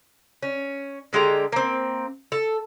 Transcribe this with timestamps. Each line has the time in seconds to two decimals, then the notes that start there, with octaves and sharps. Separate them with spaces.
0.43 C#4
1.13 D3 G#3 G4 A#5
1.52 A#3 C4
2.32 A4